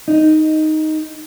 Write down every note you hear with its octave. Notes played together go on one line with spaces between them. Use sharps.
D#4